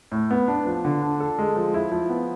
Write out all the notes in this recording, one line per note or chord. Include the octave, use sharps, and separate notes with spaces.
A2
B3
D4
F3
D3
D4
A4
G#3
F3
E4
F3
B3